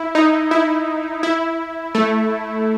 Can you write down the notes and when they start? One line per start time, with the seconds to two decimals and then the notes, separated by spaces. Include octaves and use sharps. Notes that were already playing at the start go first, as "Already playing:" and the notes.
Already playing: E4
0.15 D#4
0.51 E4
1.23 E4
1.95 A3